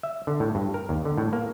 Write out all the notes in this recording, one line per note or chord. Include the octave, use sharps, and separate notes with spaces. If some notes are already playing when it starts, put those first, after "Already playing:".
E5
D3
A2
G2
A#4
D#2
D3
A2
A#3